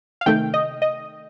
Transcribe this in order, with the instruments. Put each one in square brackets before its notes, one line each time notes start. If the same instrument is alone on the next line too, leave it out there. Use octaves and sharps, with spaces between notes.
[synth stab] F5
C3 D#3 A3 G5
D#5
D#5